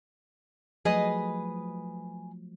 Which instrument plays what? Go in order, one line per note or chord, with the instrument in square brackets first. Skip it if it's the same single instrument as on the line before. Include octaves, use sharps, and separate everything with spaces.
[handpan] F3 F#3 A3 [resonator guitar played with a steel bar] G#4 B4 D#5